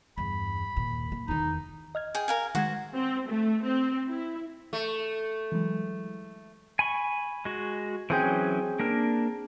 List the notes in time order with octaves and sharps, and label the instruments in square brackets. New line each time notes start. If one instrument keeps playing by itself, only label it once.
[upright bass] E2 G2 [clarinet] B5
[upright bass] D#2 A#2
A#3
[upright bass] E2 D#3 [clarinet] D#4
[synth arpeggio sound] D#5 F6 G#6
[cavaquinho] G#4 G5
A#4 F5 G#5
[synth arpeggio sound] D#3 G#3 G#6 [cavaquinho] F#4 C5
[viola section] C4
A3
C4
E4
[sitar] A3
[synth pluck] E3 F#3 G#3
[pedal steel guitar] G#5 B5 C#6
G#3 F#4
[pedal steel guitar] E3 F#3 C#4 [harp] C4 G#4 G5
[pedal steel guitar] A#3 D4 A#4